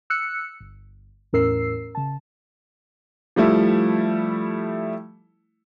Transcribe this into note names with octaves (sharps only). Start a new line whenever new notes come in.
E6 F#6 C#7
G1
E2 A2 C#4 A#4 E6 C7
C#3 A5
F3 G3 A3 E4